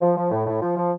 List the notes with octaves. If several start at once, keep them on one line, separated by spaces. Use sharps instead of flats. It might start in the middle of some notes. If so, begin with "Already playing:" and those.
F3
F3
A2
A2
F3
F3